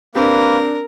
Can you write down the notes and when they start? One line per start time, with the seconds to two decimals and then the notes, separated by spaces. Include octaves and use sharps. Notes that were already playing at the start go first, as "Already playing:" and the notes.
0.15 A#3 C4 D4 G4 A#4 B4